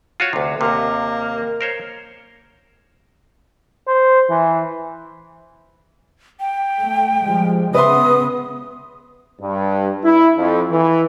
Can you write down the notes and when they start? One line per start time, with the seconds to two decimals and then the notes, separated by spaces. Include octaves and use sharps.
0.20 F4 F#4 C#5
0.33 D2 C3
0.61 D#2 C3 A#3
1.61 A#4 C5 C#5
3.87 C5
4.30 E3
6.40 G5
6.81 A3
7.22 F3 G3 G#3
7.74 C#3 B3 B4 E5 C6 D#6
9.41 G2
10.04 E4
10.37 F2
10.70 E3